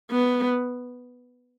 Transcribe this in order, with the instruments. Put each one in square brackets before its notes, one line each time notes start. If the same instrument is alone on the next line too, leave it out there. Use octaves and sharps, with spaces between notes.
[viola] B3